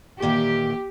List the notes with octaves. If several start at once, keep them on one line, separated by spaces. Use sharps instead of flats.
A#2 D#3 E3 G4